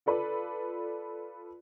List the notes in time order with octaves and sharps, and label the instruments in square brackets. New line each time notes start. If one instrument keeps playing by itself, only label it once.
[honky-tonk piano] F4 A4 B4 D5